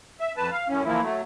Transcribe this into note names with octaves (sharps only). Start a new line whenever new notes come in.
E5
F2 B4 A5
F5
F#2 A2 C#4
E3 F3 A#3 E4
F#3 A3